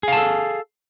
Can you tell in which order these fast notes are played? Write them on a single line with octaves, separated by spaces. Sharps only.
G#4 F5 A5 A4